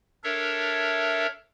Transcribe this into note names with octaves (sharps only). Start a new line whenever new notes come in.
D4 A4 A#4 C#5 E5